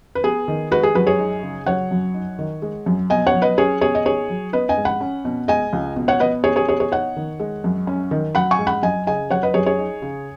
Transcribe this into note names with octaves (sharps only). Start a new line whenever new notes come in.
B4
B3 G#4
D#3
G#3 F#4 B4
G#4
F#2 F#4 B4
G#4 C#5
D#4
C#3
F#3 C#5 F#5
F#2
D#4
D#3
G#3
F#2
B2 D#5 G#5
C#5 F#5
F#3
B4 D#5
C#4 G#4 C#5
B2 G#4 C#5
D#5
D#4 G#4 C#5
F#3
B3 B4 D#5
D#5 G#5
G#2
F#5 B5
C#4
B2
G#3 D#5 G#5
C#2
B2
C#5 F#5
B3 B4 D#5
D#4 G#4 C#5
G#4 C#5
B2 G#4 C#5
G#4 C#5
D#4 C#5 F#5
D#3
G#3
F#2
C#4
D#3
F#3 F#5 B5
G#5 C#6
G#2
F#5 B5
F#2 D#5 G#5
C#3 D#5 G#5
F#3 C#5 F#5
B4 D#5
F#2 G#4 C#5
G#4 C#5
D#4
C#3